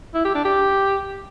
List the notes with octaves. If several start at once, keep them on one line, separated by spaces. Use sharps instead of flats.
E4
G4
D4
G4